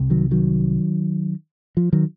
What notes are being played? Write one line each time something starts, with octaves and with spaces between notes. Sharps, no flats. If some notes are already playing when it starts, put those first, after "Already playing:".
Already playing: C2 C3
D#3 F#3
D#3 F#3
F3
D#3 F#3